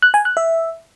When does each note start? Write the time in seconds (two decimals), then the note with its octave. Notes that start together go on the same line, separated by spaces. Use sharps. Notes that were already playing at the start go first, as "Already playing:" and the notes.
0.02 F#6
0.14 G#5
0.25 F#6
0.37 E5